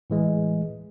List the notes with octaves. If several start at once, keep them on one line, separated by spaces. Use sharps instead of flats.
A2 E3 G#3